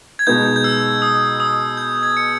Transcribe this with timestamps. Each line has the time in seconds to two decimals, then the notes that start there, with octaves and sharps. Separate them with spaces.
0.19 G#6
0.27 B2 G#3 B3 D#4 G6
0.56 G6
0.64 E6
1.02 D#6
1.40 D#6
1.77 G6
2.03 G#6
2.17 C#7